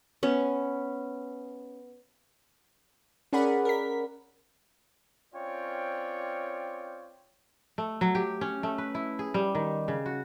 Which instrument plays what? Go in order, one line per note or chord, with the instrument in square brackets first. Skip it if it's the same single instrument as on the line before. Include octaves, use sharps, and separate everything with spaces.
[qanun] B3 C#4
[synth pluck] C#4 G#4 A#4 D5 F#5 B5
A#4 B6
[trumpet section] C4 C#4 F4 C#5 D5 G5
[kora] A3
F#3
G4
C#4
A3
B4
E4
G#4
G3
D#3
C#3
F#4